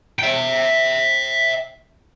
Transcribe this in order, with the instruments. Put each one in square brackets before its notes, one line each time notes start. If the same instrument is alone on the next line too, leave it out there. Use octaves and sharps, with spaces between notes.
[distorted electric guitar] E5 G5